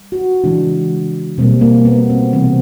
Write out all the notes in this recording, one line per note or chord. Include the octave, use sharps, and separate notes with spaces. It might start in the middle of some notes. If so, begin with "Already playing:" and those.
Already playing: G3
F#4
C#3 E3 G#3 D4
B2 G3 A#3 C4
A#3
B3
C4
C3 E3 G3 C4